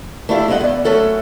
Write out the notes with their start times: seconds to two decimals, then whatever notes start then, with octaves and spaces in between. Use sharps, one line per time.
0.29 A3 D4 E4 F4 G4
0.48 G2 G#3 A3 F4 D#5 F#5
0.61 E2 D5
0.85 F#2 A3 C#4 A4 F#5